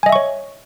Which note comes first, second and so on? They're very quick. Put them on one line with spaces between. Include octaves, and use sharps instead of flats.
G#5 D#5 E5 C#6 C#5